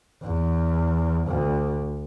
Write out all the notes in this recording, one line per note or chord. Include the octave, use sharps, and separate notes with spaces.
E2
D2